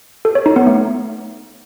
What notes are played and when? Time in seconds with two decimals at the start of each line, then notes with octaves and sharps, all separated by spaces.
0.25 A4
0.35 C#5
0.46 D#4
0.56 B3
0.67 A3